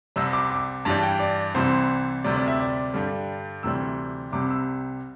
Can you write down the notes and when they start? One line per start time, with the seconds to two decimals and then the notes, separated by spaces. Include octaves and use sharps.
0.16 C2 C3 G3 E6
0.33 D6
0.50 D6
0.85 G2 E3 G3 A5
1.03 G5
1.20 D5
1.54 C2 C3 E3 G3 C5
2.24 D2 C3 G3 D5
2.36 D5
2.48 E5
2.60 D5
2.94 G2 D3 G3
3.63 D2 C3 E3 G3 E6
4.32 C2 C3 G3 D6
4.50 E6